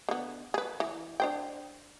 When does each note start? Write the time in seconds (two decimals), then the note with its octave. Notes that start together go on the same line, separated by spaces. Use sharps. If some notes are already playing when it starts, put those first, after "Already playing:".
0.09 D3 B3
0.54 G#4 B4
0.80 E3
1.20 D4 C5 G5